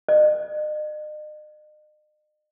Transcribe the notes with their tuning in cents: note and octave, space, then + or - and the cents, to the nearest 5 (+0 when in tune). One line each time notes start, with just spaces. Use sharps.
D#5 -40